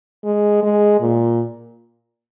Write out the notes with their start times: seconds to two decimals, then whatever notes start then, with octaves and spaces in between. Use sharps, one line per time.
0.25 G#3
0.63 G#3
1.01 A#2